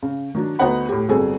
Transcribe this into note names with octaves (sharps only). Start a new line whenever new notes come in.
C#3
D#3 F#3 D4
D2 B3 D#4 C5 F#5 B5
A2 G4
G1 F#3 C4 G#4 A4